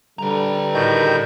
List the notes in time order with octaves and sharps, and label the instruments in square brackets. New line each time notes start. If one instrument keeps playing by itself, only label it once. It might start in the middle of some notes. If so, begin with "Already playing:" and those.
[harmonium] D3 G3 [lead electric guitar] B4 A#5
[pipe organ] A2 F#4 G6 [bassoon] D#3